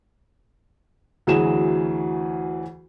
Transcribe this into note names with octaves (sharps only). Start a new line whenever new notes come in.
D2 E3 F#3 G#4 E7